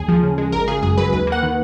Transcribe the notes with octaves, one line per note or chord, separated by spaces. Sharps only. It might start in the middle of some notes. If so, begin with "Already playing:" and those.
Already playing: D#2 G#4
F3
C#3
G#3
G#1 A#4
C#3 G#4
F#2 G#4
F#3 B4
D#2 B4
A#3 F#5
D#3